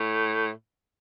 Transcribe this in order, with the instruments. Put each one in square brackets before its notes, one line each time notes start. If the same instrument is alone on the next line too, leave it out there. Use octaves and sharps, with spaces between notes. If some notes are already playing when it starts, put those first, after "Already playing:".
Already playing: [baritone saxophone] A2